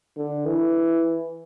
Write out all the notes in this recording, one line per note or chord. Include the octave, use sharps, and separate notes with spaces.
D3
E3